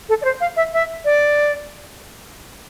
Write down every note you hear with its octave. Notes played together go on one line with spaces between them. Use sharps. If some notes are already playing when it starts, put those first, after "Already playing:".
A4
D5
C5
F5
E5
E5
D5